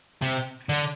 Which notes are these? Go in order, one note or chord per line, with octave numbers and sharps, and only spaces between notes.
C3
D3